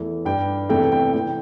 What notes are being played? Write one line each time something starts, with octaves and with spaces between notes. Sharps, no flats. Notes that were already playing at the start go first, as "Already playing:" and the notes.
Already playing: E2 E3 A3
G2 G3 G5
E2 C3 A3 G5
G5
C3 E3 G5